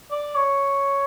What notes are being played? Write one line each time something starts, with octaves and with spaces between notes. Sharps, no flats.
D5
C#5